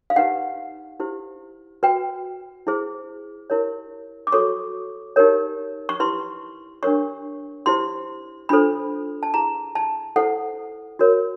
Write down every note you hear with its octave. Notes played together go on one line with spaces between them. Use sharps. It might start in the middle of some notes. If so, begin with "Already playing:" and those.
F5
D#4 G4 B4 F#5
E4 G4 C5
F#4 B4 G5
E4 G#4 C5
E4 G4 A#4 C#5
D6
F#4 A4 C#5 C#6
D#4 G4 A#4 C#5
C#6
E4 G4 B4 C6
D4 G4 A#4 C#5 C#6
E4 G4 C5 C6
D4 F4 A4 C5 B5
A5
E4 G#4 B4 A#5
A5
E4 A4 C5 F#5
F#4 A#4 C#5